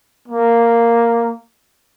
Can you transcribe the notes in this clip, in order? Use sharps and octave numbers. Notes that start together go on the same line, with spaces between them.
A#3